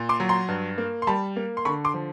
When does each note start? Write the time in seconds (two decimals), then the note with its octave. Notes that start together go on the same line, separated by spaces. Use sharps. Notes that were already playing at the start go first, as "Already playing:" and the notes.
Already playing: A#2
0.09 C6 D6
0.20 F#3
0.29 A#5 C6
0.48 G2
0.78 A#3
1.02 C6
1.07 G3 A5 B5
1.36 A#3
1.57 C6
1.65 D3 B5 C#6
1.85 C6 D6
1.94 F3